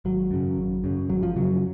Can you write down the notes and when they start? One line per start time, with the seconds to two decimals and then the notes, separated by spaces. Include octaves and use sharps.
0.05 G#1 F#3
0.31 F#2 C#3
0.56 G#1
0.84 F#2 C#3
1.10 G#1 F#3
1.23 F3
1.36 F#2 C#3 F#3